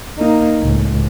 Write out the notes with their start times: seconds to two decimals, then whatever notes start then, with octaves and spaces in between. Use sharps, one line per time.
0.18 A#3 D#4
0.61 C#2 A2